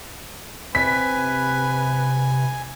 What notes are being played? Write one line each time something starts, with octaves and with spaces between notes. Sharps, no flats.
C3 B4 G#5 B6